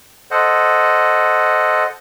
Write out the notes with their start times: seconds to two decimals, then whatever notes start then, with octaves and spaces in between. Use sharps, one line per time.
0.31 A4 C5 D#5 F#5